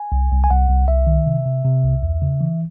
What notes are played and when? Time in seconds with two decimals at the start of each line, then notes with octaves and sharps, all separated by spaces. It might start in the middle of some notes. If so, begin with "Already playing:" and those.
Already playing: G#5
0.12 C2
0.32 C2
0.44 G#5
0.50 C2 F#5
0.69 C2
0.88 C2 E5
1.07 D#3
1.26 C3
1.46 C3
1.65 C3
1.84 C2
2.03 E2
2.22 C#3
2.41 E3